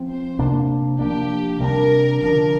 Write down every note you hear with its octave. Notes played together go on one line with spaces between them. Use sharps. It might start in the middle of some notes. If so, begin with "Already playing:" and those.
Already playing: F3 C4
C5
C3 A#3 D4
F3 A#3 D4 G4
C3 G3 A#3 D4 A#4
D3 F3 D4 A#4